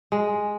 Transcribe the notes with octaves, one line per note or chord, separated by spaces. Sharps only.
G#3